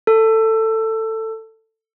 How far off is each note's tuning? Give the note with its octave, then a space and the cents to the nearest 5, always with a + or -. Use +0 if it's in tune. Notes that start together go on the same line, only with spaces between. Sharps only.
A4 +15